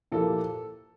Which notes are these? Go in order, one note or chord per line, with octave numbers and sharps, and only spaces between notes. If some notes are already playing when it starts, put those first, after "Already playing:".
A#2 F3 A#3 E4 G4 A4